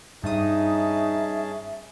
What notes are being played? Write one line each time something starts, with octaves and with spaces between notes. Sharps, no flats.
G2 C#4 D#4 G#4 E5 A5 D#6